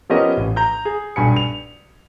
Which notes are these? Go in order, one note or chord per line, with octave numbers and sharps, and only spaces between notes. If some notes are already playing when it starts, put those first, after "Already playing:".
F3 B3 C#4 G4 A#4 D#5
A1
A#5 G6
G#4
B1 G2 G#5 B5 C#7
F7